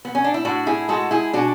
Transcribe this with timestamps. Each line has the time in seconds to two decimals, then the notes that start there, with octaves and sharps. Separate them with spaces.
0.05 B3
0.15 C#4
0.24 D4
0.34 E4
0.45 A2 D4 F#4
0.67 E4 G#4
0.89 G#3 F#4 A4
1.11 E4 G#4
1.33 B2 D4 F#4